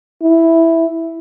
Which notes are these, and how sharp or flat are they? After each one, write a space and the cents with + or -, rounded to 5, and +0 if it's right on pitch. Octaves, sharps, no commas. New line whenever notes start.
E4 +0